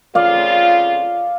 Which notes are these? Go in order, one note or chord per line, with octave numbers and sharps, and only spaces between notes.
F2 C#3 F4 D5 F5